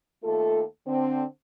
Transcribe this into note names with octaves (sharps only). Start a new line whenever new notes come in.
D#2 A3 F4 A4
D3 C4